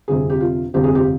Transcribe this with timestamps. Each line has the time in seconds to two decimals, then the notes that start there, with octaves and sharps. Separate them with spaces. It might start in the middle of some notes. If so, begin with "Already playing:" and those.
0.08 G1 F2 C3 G#4
0.30 G4
0.41 F4
0.74 G1 F2 C3 G4
0.84 G#4
0.95 G4